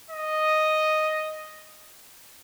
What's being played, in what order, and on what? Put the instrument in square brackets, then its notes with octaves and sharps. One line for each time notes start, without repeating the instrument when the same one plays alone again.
[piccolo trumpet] D#5